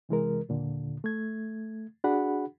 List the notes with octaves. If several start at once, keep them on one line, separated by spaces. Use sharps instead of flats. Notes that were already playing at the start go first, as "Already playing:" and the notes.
C3 E3 G#3 A#4
D#2 A#2 D3
A3 G#6
D4 F#4 G#4 F#5 B5